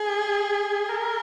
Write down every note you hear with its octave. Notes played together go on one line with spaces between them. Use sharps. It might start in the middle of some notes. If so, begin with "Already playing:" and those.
Already playing: G#4
A#4